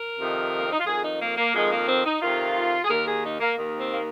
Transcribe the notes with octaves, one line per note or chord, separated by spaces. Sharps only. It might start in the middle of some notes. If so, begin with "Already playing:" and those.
Already playing: A#4
F2 C3 D#3
A#3
C4
D#4
F4
F2 D#3 G#4
D#4
A#3
A#3
F2 D#3 G#3
A#3
C4
D#4
F2 C3 D#3 F4
G#4
D#2 D#3 A#4
G#4
D#4
A#3
D#2 D#3
C4
A#3